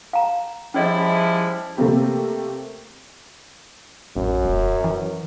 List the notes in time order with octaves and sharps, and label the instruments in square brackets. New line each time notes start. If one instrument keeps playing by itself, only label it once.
[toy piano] F5 A#5
[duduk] F3 [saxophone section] G3 G#3 E4 [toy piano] C#4 C#5 D#5
[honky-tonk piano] C3 A3 A#3 C4 G4
[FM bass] A1 [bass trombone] F#2
[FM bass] E1
E3